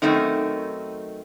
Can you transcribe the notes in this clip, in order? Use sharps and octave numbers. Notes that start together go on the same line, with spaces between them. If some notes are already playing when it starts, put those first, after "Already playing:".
F#2 D#3 A3 C4 D#4